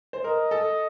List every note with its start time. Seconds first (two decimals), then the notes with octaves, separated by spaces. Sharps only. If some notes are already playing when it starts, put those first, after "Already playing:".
0.13 C5
0.24 A#4 D#5
0.51 A4